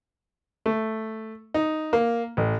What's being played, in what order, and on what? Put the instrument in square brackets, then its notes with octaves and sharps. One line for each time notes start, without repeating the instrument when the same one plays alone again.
[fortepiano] A3
D#4
A#3
A1